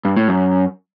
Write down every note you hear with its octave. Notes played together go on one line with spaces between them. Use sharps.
G2
A2
F#2